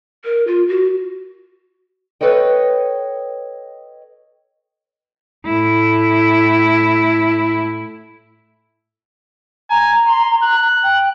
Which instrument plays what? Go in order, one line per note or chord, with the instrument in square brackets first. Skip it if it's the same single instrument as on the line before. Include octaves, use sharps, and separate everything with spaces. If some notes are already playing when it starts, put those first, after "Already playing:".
[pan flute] A#4
F4
F#4
[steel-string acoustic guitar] A4 B4 C#5 D#5 G5
[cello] A2 E4
[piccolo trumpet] G#5 [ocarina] A#5
[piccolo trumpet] C6
F#6
[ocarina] G5